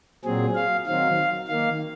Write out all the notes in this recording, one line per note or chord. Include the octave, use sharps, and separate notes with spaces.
A#2 F#3 C4 G#4
F5
D#3 F#3 C4 F5
D#3 A#3 F5